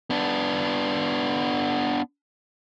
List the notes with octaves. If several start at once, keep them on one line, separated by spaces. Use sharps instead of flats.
B3 D4